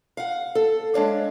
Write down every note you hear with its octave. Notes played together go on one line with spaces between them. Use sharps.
F5 F#5
A4
G#3 D4 C#5 F5